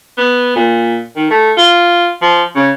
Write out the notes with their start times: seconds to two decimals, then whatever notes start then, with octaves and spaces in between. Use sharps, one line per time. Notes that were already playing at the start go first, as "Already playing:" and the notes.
0.18 B3
0.56 A#2
1.16 D#3
1.31 A3
1.57 F4
2.22 F3
2.56 C#3